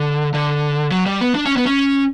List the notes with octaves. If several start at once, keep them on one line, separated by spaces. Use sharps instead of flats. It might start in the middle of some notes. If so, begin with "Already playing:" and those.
Already playing: D3
D3
F#3
G3
B3
D4
C#4
B3
C#4